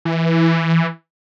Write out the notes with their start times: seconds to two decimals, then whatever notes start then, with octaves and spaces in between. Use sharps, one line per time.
0.05 E3